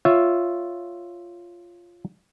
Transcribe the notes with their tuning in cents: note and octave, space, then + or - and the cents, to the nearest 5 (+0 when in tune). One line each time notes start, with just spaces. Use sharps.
F4 +0 C#5 +0 E5 +0